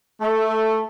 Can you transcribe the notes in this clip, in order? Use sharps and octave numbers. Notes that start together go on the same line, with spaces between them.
A3